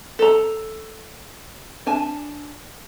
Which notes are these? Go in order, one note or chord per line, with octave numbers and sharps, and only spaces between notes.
A4 A#5
D4 G#5 A5